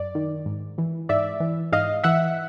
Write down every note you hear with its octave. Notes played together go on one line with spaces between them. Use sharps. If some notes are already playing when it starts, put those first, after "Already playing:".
Already playing: F#2 D5
D#3
G#2
E3
G#2 D5 E5
E3
G#2 D#5 F5
E3 E5 F#5